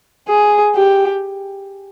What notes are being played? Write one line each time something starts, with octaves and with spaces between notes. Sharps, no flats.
G#4
G4